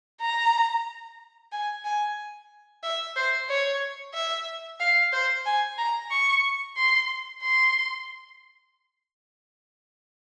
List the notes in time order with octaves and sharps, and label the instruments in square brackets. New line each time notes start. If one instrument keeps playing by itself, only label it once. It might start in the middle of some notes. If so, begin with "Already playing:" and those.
[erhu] A#5
G#5
G#5
E5
C5
C#5
E5
F5
C5
G#5
A#5
C#6
C6
C6